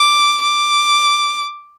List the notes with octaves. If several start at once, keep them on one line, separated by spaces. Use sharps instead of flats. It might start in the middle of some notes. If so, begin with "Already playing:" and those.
Already playing: D6
D6